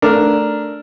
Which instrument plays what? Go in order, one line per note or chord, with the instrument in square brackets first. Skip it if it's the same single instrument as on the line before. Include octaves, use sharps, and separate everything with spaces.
[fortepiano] A3 D4 A#4